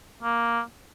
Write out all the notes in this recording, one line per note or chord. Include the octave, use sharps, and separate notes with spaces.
A#3